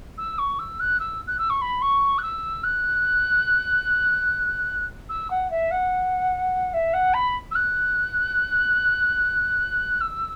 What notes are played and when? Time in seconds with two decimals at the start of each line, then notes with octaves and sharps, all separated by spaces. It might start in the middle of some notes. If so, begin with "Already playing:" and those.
0.18 E6
0.38 C#6
0.59 E6
0.80 F#6
1.00 E6
1.27 F#6
1.38 E6
1.50 C#6
1.61 B5
1.82 C#6
2.18 F#6
2.23 E6
2.64 F#6
5.09 E6
5.30 F#5
5.50 E5
5.71 F#5
6.73 E5
6.93 F#5
7.14 B5
7.51 E6
7.55 F#6
10.01 E6